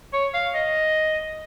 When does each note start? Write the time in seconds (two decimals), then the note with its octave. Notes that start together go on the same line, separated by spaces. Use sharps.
0.13 C#5
0.34 F5
0.54 D#5